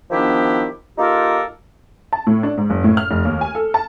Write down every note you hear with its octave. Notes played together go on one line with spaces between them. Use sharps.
D#3 F3 B3 D4 E4 G4
A#3 D#4 F4 G4 A4 A#4
A5
A2
D4
G#2
F#1
A2
F6
F1
D#2
G#5
A4
A5